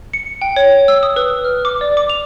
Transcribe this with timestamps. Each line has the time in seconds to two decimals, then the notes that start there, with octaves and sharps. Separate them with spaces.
0.13 C#7
0.42 G5
0.56 C#5
0.88 E6
1.03 D#6
1.16 B4
1.45 F6
1.65 D6
1.81 D5
1.97 D6
2.10 F7